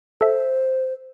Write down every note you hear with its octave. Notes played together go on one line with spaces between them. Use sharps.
A4 C5 E5